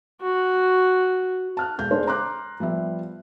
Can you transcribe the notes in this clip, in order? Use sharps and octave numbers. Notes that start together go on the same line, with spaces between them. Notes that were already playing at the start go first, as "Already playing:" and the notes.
F#4
A5 F6 F#6
E1 G6
G#3 D4 C5
A#5 C6 D6 F#6
F3 G3 B3 E5